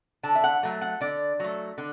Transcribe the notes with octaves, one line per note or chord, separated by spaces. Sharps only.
D3 A5
E5
F#5
F#3 A3
F#5
D3 D5
F#3 A3
D3